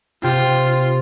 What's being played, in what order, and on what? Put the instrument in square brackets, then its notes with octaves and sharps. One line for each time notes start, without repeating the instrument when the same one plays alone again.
[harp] C3 G4 [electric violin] F4